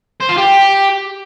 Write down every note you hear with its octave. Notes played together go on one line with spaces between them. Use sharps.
C5
F4
G4